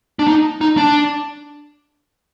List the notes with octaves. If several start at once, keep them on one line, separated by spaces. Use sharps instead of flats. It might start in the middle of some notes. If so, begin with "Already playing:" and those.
D4
D#4
D#4
D4